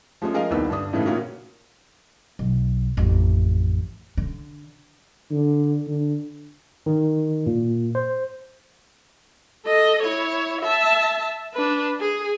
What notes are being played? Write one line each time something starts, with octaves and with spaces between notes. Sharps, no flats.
F3 G#3 A3 C#4
F4 G#4 A#4 D#5 F5
D#1 C2 D#3 B3 E6
G2 D3 D4 D#6
A2 C#3 E3 G3 A3 D#4
A#2 C#3 C#4 F4 F#4 A#4
B1
A1 F2
D3
D3
D3
D#3
A#2
C5
A4 D#5
E4 C#5
E5 A5
D4 B4
G#4